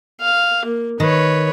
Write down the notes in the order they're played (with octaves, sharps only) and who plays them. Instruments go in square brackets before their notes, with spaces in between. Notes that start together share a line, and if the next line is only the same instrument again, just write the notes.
[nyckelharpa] F5
A#3
[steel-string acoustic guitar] D#3 [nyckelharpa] B4 C#5